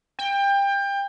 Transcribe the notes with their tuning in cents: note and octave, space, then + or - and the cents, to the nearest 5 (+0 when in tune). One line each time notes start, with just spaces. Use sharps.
G5 +25